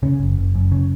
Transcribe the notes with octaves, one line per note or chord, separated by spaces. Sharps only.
C#3 C#4
F#1
F#1
F#2
C#3